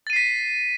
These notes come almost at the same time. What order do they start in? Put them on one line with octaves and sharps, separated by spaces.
A6 D#7 C7 B6